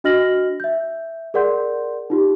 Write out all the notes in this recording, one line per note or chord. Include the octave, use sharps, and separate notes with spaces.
D4 F#4 D#5 F6 A#6 F#7
E5 G6
G#4 A#4 D5 F#5 C6 G6
D#4 F4 G4